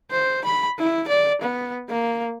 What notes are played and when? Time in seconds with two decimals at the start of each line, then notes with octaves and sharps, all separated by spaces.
0.11 C5
0.45 B5
0.78 E4
1.08 D5
1.42 B3
1.89 A#3